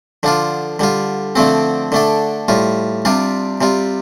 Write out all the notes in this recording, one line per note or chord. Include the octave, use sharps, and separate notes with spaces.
D3 F3 D4 F4
D3 G3 F4
D3 F3 A3 C4
D3 A3 D4
A2 G3 F4
C3 G3 D4 F4
C3 G3 F4